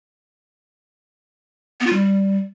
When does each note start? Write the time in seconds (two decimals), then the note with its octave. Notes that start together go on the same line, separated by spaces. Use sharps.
1.80 B3
1.87 F4
1.93 G3